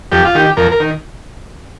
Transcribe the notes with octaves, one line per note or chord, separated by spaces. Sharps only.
F2 G4
F4
D#3 G4
F2 A#4
A#4
D#3